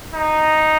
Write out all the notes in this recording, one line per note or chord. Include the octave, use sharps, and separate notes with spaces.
D#4